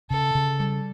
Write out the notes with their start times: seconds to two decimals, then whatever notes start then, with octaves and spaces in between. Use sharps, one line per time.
0.10 C#3 A4
0.35 C#3
0.60 G3